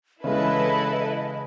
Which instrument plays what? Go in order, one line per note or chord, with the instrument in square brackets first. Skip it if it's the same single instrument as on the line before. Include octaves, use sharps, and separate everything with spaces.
[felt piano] C#3 E3 G#3 [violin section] E4 A4 B4 [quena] D#5